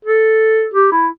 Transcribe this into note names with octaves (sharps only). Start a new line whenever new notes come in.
A4
G4
E4